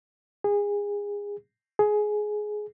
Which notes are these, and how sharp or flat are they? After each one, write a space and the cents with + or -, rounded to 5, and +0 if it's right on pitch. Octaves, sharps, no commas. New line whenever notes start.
G#4 -25
G#4 +15